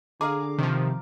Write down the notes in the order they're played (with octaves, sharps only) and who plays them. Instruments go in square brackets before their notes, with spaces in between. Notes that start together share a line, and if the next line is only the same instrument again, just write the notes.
[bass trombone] D3 [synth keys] G#4 [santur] F5 A#5 D6
[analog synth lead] C3 [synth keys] D#3 F3